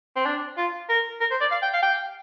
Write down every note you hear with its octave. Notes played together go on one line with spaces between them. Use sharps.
C4
D4
F4
A#4
A#4
C5
D5
F5
G5
F5
G5